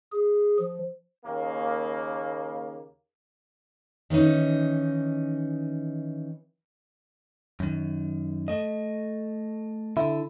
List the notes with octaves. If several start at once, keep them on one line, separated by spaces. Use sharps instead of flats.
G#4
F3
D#2 C#3 A#3
D#3 E3 C#4 D#4
F#2 D#3
A3 D#5
D3 E4